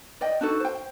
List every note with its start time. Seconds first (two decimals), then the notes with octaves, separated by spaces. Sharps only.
0.21 D5 D#5 G5
0.41 D4 D#4 F#4 A4
0.60 C5 G5